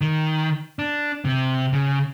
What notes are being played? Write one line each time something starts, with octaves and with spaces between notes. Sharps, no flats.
D#3
D4
C3
C#3